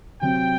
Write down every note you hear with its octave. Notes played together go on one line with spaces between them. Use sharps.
C3 F#3 C4 G5